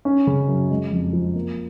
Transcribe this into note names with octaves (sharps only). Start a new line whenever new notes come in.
C#4
C#3
F#2
G#3
F2
F3
A#3